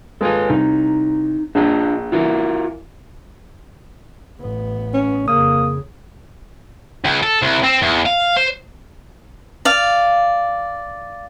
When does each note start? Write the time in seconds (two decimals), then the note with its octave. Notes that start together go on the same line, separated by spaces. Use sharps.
0.21 G#3 F4 A4 B4 G#5
0.50 C2 D#4
1.55 A#1 D4 F4 D#5
2.12 E3 F4 F#4 A#4
4.40 A1 B3
4.94 C#4
5.28 F2 C#3 A#3 D#6
7.05 C#2
7.23 A4
7.42 C2
7.63 C4
7.82 E2
8.06 F5
8.37 C5
9.65 D5 F5